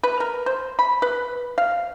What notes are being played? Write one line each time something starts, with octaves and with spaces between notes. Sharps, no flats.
B4
A#4
C5
B5
B4
F5